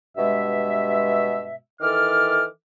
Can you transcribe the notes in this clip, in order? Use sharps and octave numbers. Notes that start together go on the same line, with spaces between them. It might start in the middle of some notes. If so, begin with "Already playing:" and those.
G2 B2 G#3 E5
D#3 E3 A4 D6 F6